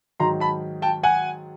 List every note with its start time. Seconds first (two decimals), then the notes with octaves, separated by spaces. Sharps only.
0.20 G#2 D#3 F#3 A#5 C6
0.40 A5 B5
0.82 G5 A5
1.03 F#5 G#5